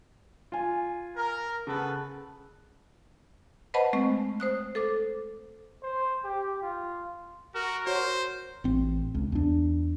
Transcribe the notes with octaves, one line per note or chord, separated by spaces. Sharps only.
F4 G#5
A#4
C#3 B3 A4 B4
B4 C5 D#5 F#5 A5 B5
G#3 A3 C4 C#6
C5 D#6 F#6
A4 C5 D6
C5
G4
F4
F#4 A#4
F#4 C5 C#5
A1 C4
C#2
E2 D4